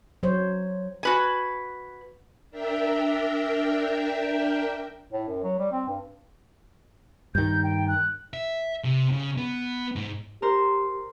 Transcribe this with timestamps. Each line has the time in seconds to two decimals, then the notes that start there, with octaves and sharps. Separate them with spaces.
0.23 F#3 C5 C#5
1.03 F#4 B4 G#5
2.51 D4 A#4 E5 G5
5.13 A2
5.28 F#2
5.44 F#3
5.59 G3
5.72 C4
5.88 G2
7.35 G2 D#3 G6
7.64 G5
7.88 F#6
8.34 E5
8.84 C3
9.12 C#3
9.38 B3
9.96 G#2
10.42 G4 A#4 C5